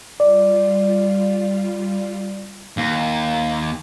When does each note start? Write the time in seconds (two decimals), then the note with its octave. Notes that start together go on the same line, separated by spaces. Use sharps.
0.20 G3 F4 D5
2.77 D#2